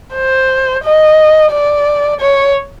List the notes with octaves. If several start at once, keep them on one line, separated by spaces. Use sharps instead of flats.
C5
D#5
D5
C#5